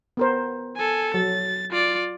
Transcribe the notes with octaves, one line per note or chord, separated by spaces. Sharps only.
B3 A#4 C5
A4 G#5
F#3 A6
F4 D5